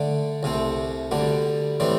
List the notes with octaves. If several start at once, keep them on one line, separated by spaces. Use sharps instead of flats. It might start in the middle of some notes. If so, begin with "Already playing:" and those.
Already playing: D3 A3 D4
C2 C3 A3 C4
D2 D3 G3 D4
A2 E3 G3 C4